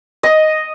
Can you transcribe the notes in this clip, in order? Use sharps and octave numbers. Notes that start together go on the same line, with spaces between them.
D#5